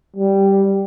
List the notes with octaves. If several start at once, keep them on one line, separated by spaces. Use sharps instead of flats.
G3